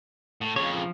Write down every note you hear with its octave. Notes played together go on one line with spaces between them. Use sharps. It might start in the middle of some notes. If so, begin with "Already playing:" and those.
A2
F2 C#3 C#5
F3